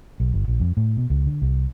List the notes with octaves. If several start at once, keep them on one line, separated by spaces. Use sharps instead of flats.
B1
G1
A#1
F2
A2
B2
C#2
D3
C2